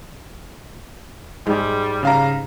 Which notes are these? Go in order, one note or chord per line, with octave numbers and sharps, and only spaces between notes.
G#2 G3
C#3 F5 A#5